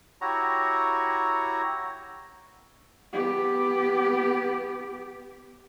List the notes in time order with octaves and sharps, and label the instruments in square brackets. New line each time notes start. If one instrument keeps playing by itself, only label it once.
[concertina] E4 F#4 G4 C#5 A#5
[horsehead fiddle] B3 G4